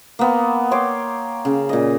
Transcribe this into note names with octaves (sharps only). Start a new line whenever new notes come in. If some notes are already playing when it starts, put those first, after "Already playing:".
A#3 B3
C#5 G5 C6 D6
C#3
A#2 D#5